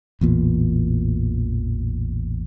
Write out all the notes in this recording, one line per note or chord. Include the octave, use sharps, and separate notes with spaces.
A1 E2 A#2